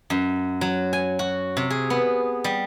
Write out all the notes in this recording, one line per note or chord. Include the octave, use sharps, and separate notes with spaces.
F#2
F#3
G#5
F#4
C3
G#4
B3
G3